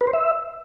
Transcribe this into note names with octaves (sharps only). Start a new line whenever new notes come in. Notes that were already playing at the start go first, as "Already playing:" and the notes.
B4
C5
E5